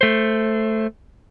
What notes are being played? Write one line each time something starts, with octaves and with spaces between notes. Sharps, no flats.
A3 C5